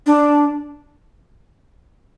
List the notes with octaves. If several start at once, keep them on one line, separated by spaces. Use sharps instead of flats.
D4